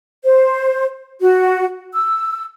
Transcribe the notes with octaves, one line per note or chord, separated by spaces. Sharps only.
C5
F#4
E6